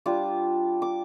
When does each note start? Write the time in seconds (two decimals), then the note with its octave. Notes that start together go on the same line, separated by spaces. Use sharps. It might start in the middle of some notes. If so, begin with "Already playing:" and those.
0.06 G3 D4 F4 D6
0.82 D6